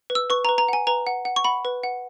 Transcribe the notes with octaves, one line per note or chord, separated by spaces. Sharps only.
B4
E6
B4 C#6
B4 A#5
A#5
F#5 G#5
B4 A#5
F#5
F#5
C#6
F#5 B5
B4
F#5